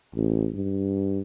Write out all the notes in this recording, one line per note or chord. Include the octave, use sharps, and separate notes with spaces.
A1
G2